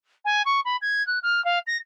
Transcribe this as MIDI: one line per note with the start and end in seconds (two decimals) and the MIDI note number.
0.25 0.43 80
0.46 0.61 85
0.65 0.77 83
0.82 1.05 92
1.07 1.19 90
1.23 1.44 89
1.45 1.59 77
1.67 1.77 94